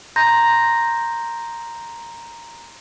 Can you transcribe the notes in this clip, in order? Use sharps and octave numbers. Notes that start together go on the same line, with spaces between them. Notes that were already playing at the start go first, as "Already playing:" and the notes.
A#5 C6 G6 A#6